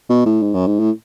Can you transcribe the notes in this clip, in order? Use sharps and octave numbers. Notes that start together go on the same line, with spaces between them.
B2
A2
G#2
F#2
G#2
A2